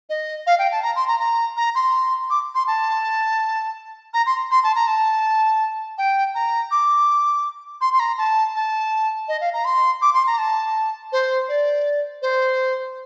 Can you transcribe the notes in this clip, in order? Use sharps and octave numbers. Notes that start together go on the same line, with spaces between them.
D#5
F5
G5
A5
A#5
C6
A#5
A#5
A#5
C6
D6
C6
A5
A#5
C6
C6
A5
A#5
A5
G5
A#5
D6
C6
C6
A#5
A5
A5
D#5
F5
A#5
C6
D6
C6
A#5
A5
C5
D5
C5